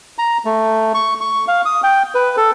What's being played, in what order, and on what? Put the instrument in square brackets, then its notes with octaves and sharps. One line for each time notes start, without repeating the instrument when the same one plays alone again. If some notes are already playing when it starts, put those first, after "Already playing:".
[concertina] A#5
A3
C#6
C#6
F5
D#6
G5
B4
A4